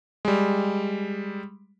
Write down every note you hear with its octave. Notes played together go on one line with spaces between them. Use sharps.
G3 G#3